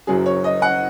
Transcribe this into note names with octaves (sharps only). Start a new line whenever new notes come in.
F#1 F#2 F#3 G#4
C#5
D#5
F#5